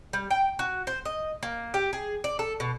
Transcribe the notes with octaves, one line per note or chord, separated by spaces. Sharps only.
G3
G5
F#4
C5
D#5
A#3
G4
G#4
D5
A4
B2